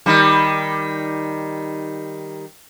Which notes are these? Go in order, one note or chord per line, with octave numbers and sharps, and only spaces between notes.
D#3 G3